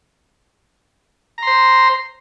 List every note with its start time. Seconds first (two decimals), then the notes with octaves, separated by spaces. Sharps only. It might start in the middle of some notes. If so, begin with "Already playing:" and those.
1.38 A#5
1.43 C6
1.47 C5